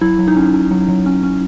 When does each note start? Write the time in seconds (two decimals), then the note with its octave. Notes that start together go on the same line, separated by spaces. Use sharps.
0.01 F#3 E4
0.19 F#3
0.28 D#4
0.36 C#4
0.54 C#4
0.71 F#3
0.89 F#3
1.06 C#4
1.23 C#4